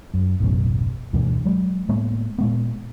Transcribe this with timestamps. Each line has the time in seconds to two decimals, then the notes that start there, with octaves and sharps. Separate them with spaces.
0.14 F#2
0.40 D1 A1 F#2 B2
1.13 D2 G2 B2 E3
1.45 F#3 G#3
1.88 A2 G#3 A#3 B3
2.38 A#2 G#3 B3